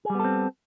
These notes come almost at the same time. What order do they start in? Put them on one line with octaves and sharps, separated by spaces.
G#4 G3 B3 A4 C4